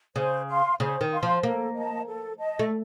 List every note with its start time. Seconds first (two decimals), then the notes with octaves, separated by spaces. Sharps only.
0.16 C#3 C5
0.48 F5 C6
0.80 C#3 C5
1.01 D#3
1.11 F5 C6
1.23 F3
1.43 A#3 A4
1.75 D#5 A5
2.07 A4
2.39 D#5 A5
2.59 A3